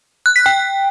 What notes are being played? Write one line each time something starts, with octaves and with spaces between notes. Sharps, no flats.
F#6
B6
G5